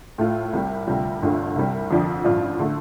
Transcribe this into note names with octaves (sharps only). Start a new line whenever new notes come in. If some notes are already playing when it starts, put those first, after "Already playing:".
A2 A3 F4
C2 C3 G3
D2 C3 G3 F4
G1 G2 D3 A3 F4
C2 C3 G3
F2 D3 F3 D4
A1 G2 F3 D4 F4
D3 A3